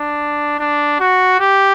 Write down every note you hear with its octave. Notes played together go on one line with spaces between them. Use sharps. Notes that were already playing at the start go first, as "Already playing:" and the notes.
Already playing: D4
D4
F#4
G4